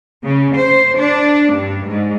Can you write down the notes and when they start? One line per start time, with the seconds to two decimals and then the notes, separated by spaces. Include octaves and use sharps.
0.25 C#3
0.57 C5
0.98 D4
1.53 G2
1.88 G#2